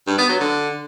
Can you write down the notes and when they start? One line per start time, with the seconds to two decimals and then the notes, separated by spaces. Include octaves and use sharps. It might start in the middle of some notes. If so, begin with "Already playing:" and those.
0.07 G2
0.18 B3
0.29 F#3
0.40 D3